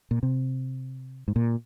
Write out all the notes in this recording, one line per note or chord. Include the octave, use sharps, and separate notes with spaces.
A#2
C3
G#2
A#2